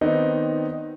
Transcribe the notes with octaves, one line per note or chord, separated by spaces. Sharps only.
D#3 B3 C4 D#4 D5 D#5